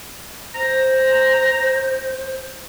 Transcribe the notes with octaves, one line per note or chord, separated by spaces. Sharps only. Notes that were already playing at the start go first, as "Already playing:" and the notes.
C5 A#5